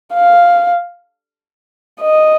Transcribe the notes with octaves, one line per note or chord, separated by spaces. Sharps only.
F5
D#5